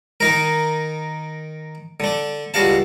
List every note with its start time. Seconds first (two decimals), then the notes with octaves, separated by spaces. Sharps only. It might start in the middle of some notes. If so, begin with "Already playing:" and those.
0.20 D#3 D#4 A#4
2.00 D3 D4
2.54 C#2 G3 F#4 F5 A5